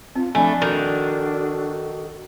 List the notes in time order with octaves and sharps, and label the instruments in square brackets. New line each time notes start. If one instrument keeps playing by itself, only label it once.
[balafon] C4 [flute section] F4
[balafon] F3 G#5 [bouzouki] A3 [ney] D4 [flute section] B5
[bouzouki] D#3 [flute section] F#4 A4